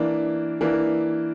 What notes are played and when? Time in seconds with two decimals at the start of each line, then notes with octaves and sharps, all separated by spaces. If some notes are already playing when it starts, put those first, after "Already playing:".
Already playing: E3 A#3 D4
0.61 E3 A#3 D4